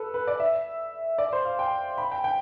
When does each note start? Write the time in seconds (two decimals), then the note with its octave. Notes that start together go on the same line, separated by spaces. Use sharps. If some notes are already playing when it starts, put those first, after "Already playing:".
Already playing: A4 B4
0.14 B4
0.27 D5
0.40 E5
1.18 D5
1.33 C5
1.45 F5
1.59 G5
1.98 B5
2.11 G5
2.24 G5